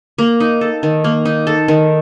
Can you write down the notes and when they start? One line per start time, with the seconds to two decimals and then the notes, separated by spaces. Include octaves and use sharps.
0.18 A#3
0.40 D#4
0.61 A4
0.83 D#3
1.04 A#3
1.25 D#4
1.47 A4
1.68 D#3